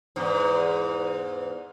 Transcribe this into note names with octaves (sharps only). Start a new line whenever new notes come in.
E2 G#2